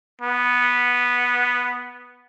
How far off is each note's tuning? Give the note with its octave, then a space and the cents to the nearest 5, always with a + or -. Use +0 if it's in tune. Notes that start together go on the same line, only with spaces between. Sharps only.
B3 -5